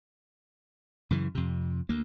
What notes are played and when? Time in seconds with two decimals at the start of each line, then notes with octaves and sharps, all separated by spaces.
1.11 F#2 C#3 E3
1.35 F2 C3
1.89 D2 A#3